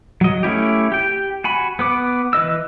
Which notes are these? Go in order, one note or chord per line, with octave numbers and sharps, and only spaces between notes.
F#3 D#5
A3 C#4 E4 G4
G4 G5
F#4 G#5 B5
B3 B4 D6
E3 B4 D#5 E6